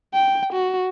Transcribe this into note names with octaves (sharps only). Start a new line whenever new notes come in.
G5
F#4